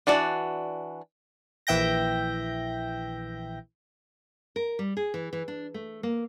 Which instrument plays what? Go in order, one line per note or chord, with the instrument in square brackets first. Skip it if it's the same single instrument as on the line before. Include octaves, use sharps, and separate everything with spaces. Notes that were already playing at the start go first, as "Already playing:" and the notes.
[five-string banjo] E3 D4 F#4 D5
[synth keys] A#1 E3 E5 G5 G6 A#6
[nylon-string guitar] A#4
G3
G#4
E3
E3
D4
A3
A#3